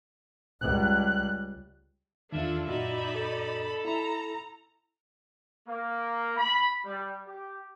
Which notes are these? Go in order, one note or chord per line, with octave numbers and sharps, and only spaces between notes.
C#2 G3 F#6
E2 D#3 D4 E4 F4 A4 E5
F#2 A#2 D#4 F#4 D5 B5
A4
E4 A#5 B5
A#3
B5
G3
G4